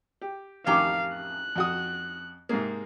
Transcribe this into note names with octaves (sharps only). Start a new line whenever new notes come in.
G4
A1 F2 D#3 C#4 G4 F5 A#5
F#6
F2 F#4 D#6
G#2 C3 A#3 G#4